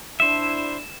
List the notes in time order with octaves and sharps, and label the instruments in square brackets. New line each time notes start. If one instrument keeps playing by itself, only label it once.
[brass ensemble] D4 E4 [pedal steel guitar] C5 E5 [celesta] E7